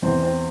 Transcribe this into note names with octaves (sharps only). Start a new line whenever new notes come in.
E2 C4
C4